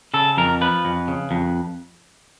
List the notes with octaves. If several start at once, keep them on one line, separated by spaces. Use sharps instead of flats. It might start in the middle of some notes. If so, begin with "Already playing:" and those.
C#3 A4
F2 A#4
F3 B4
F2
C#3
F2